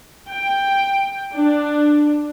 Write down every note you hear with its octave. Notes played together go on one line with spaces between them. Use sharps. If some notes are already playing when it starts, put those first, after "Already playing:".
G5
D4